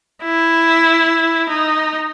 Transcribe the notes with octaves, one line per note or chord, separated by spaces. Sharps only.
E4
D#4